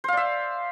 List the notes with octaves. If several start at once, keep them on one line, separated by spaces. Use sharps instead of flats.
C5 D5 E5 F5